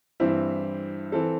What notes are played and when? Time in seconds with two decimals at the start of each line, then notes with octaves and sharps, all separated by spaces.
0.20 G2 E3 C4 E4
1.12 E3 C4 A4